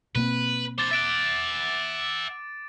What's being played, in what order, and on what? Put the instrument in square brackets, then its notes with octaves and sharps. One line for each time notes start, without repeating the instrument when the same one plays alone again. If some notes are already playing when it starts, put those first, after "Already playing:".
[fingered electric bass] B2 A#3 C4 [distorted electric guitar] B4
[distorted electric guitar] D4 C5 [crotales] D6 A6
[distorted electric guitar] E5 F#5 [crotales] A6 D7